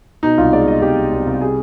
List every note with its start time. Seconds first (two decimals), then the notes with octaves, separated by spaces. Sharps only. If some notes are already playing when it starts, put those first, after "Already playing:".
0.23 B2 D#4
0.38 C2 F4
0.53 G#3 D5
0.67 B2 D#5
0.82 C2 G4
0.97 C2
1.12 C2
1.27 C2
1.41 G3 G#4